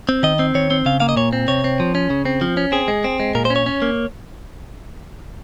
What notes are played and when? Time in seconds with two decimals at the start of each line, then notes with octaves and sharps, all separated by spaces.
0.09 C4
0.23 D#3 D#5
0.39 C4
0.55 D#3 C#5
0.71 C4
0.86 C#3 F5
1.00 A#3 F5
1.09 D#5
1.16 A#2 C#5
1.33 C4
1.48 C3 C#5
1.64 C4
1.80 F3
1.95 C#4
2.10 C#3
2.25 C4
2.41 F3
2.57 C#4
2.72 C4 G#4
2.88 G#3
3.04 C4
3.20 G#3
3.35 A#2 A#4
3.45 C5
3.50 C#4
3.56 C#5
3.66 C#4
3.82 A#3